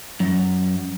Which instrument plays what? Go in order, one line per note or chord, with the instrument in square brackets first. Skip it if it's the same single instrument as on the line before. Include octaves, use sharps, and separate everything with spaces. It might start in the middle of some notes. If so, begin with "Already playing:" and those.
[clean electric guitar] F#2